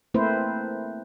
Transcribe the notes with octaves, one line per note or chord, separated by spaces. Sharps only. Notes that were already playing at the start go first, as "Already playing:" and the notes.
A3 A#3 C4 E4 B4 C5